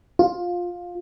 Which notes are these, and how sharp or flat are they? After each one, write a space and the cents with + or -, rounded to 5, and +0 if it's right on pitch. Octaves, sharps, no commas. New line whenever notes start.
F4 +15